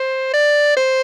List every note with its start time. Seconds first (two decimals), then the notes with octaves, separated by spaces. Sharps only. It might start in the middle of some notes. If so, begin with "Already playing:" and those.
Already playing: C5
0.34 D5
0.77 C5